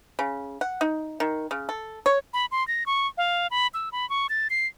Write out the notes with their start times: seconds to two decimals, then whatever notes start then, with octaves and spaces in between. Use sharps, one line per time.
0.19 C#3
0.61 F#5
0.81 D#4
1.20 D#3
1.51 C#3
1.69 A4
2.06 C#5
2.34 B5
2.51 C6
2.68 A#6
2.86 C#6
3.18 F5
3.51 B5
3.74 E6
3.92 B5
4.10 C#6
4.29 A6
4.50 C7